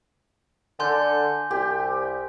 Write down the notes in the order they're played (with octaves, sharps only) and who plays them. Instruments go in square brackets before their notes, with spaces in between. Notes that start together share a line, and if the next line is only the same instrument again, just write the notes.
[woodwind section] D3 [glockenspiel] G#5 C6 G6
[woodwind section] C2 [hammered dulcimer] G4